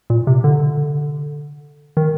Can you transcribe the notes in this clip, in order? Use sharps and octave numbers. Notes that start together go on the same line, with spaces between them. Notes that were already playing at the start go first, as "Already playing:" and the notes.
A#2
C3
D3
D#3